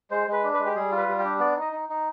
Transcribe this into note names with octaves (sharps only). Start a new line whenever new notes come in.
G#3 C5
G#3 B4
D4
B4
G#3
G4
G3 G#4
F4
B4
G3
G4
D4
B3 D5
D#4
D#5
D#4
D#4